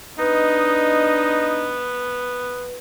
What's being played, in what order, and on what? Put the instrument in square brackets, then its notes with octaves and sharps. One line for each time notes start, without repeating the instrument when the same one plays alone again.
[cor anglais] B3 [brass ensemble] D4 D#5 [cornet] D#4 [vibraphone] B4